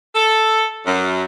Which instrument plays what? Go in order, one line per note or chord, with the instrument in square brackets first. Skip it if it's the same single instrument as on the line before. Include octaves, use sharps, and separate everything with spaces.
[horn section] A4
F#2